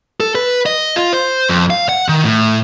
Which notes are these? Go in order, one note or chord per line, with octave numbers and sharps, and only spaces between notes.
A4
B4
D#5
F4
C5
F2
F5
F#5
D#3
A2